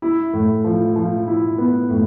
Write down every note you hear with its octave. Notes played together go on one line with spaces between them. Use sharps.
E4
A2
F3
F3
E4
B3
A2